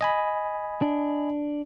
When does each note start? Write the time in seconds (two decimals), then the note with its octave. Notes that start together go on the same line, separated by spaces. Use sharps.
0.01 D#5 G#5 B5
0.82 D4